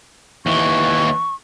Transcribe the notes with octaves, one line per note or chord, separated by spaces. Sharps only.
D#2 E3 C#6